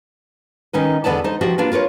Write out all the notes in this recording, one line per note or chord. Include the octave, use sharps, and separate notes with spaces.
D#3 C#4 D#4 B4
E2 D3 B3 B4 D5 A5
D#4 C5
F3 B3 D4 F#4 G4
A#3 D4 F4 B4
F4 A#4 B4 C#5